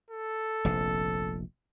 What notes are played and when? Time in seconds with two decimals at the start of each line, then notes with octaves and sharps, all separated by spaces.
0.11 A4
0.65 F1 A#1 C3